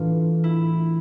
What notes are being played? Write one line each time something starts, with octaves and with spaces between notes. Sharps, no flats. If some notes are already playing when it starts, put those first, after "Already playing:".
Already playing: A2 E3 A3 D4 F4
E4